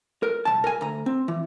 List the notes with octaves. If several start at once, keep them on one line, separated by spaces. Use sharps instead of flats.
A#4
C2 E3 A5
A#4 G#5
D2 A#5
C4
E3